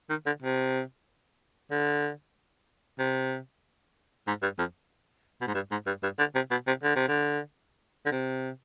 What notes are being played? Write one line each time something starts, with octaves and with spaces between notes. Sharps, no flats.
D#3
D3
C3
D3
C3
G#2
G2
F2
B2
G#2
G2
G#2
G2
G2
D3
C3
B2
C3
D3
C3
D3
D3
C3